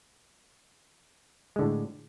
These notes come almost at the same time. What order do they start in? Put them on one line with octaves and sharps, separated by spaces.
G#3 D3 A2